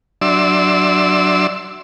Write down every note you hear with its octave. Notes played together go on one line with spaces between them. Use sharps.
F#3 D4 D5 E5 C6 E6